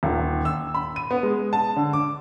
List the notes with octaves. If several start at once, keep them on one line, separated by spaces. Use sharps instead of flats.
D#1
E6
B5
D#7
B3
G#3
A5
D3
D6